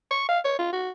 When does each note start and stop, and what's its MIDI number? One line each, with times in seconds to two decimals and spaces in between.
0.11 0.24 85
0.29 0.39 77
0.45 0.57 73
0.59 0.71 65
0.73 0.90 66